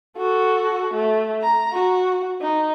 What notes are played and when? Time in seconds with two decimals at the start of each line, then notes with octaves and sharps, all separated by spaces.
0.17 F#4 A4
0.94 A3
1.42 A#5
1.73 F#4
2.42 D#4